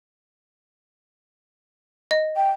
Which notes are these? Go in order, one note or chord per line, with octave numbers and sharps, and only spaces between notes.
D#5
G5